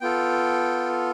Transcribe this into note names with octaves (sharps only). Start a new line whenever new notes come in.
B3 F4 A4 G5